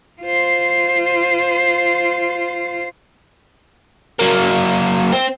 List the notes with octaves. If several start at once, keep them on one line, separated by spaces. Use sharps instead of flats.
F4 C5
F#3 A#3
C4